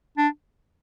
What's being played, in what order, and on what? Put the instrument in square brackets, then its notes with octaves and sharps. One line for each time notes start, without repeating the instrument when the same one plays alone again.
[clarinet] D4